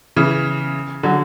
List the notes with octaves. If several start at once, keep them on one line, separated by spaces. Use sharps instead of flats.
C#3 E3
D3 F#3